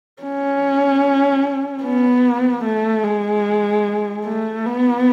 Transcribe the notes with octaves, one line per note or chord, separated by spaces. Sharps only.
C#4
B3
A3
G#3
A3
B3